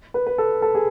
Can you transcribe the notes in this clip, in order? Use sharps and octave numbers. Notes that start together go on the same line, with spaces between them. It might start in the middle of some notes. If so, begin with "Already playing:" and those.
B4
B4
A4
A4
G#4